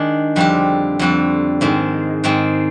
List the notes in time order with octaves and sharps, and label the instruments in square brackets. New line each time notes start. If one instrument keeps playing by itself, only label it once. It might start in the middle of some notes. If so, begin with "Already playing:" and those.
Already playing: [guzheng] D#3 G#3 D4
F2 D3 G3 C4 G4
F2 D3 G3 C4 G4
G#2 D#3 G#3 C4
G#2 D#3 G#3 C4